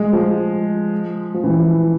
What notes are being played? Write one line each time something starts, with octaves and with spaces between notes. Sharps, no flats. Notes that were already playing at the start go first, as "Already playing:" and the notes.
Already playing: G#3
F3
F3
E3